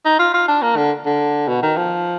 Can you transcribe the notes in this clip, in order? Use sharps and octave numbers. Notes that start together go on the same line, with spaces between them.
D#4
F4
F4
D4
A#3
D3
D3
B2
D#3
F3